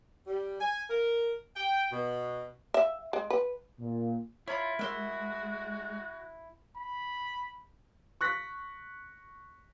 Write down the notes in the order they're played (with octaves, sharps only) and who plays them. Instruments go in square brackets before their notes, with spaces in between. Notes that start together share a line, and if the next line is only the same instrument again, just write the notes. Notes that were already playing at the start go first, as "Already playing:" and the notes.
[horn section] G3
G#5
A#4
G5
B2
[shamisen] E5
G#3
B4
[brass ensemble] A#2
[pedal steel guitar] E4 [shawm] F4 [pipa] C#5 A#5 B5
[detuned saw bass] G#3 [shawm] F#4 [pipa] A#4 E5 C6
[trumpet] B5
[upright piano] C#6 F#6 A#6 B6